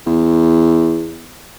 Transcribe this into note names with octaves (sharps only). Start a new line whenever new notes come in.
E2